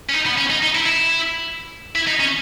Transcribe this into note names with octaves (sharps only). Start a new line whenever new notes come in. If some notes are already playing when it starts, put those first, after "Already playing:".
C#4
D#4
B3
C#4
D#4
D#4
E4
E4
E4
D#4
C#4